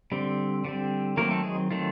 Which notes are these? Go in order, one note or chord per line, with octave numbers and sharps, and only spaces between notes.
D3 G3 C4
D3 G3 C4
D#3 F#3 A3 A#3 C4 A#4
A3 A4
G#3 G#4
D#3 F#3 A3 C4 F4